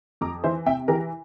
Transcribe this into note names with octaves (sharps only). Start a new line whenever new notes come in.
F2 A#5 D6
E3 C5 E5
C3 E5 G5
E3 G4 A#4